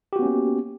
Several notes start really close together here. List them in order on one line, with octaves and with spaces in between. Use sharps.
G4 F#4 B3 C#4 A#3